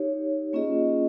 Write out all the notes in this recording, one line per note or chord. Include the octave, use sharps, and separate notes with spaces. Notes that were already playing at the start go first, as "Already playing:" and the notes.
Already playing: D#4 G4 C#5
A#3 C#4 F4 G#4 D#5